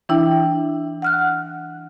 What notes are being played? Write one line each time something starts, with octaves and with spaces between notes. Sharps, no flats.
E3 D4 E4 G5
F#5 F6 F#6